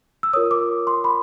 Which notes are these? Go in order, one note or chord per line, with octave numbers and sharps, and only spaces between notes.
E6
F4 A#4 C#5 D#6
D6
C6
B5